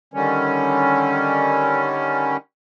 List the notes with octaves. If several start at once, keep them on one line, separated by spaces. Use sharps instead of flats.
D3 D#3 G3 C#4